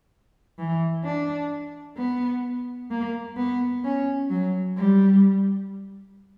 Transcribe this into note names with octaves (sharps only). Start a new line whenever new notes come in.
E3
D4
B3
A#3
B3
C#4
F#3
G3